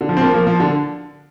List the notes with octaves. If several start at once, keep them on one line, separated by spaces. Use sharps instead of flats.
D3
F3
C4
F3 A#3
F3 A#3
F3
D3